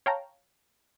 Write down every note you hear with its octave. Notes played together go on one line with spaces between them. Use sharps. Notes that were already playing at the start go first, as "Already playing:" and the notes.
C#5 F5 G5 A5 A#5